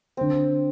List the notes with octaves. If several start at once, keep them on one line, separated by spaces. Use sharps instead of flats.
D3 C4